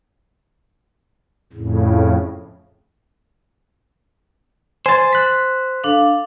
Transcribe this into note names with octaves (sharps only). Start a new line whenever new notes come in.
F2 A2 C#3
C5 G#5 A6
F#6 B6
D4 A4 F5